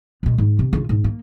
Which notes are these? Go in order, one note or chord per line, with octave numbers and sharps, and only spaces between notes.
A#2 G#3
G#2
C3
C#3 F4
G#2
A#3